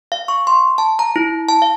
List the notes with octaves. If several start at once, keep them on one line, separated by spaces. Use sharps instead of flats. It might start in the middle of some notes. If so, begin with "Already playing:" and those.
F5
C#6
C6
A5
A#5
E4
A5
F5